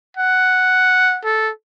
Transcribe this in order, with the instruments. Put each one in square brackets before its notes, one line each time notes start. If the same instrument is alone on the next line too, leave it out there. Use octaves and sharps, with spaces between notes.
[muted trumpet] F#5
A4